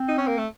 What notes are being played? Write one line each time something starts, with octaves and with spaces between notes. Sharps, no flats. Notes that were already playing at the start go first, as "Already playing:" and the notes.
Already playing: C4
D#4
C#4
A#3
A3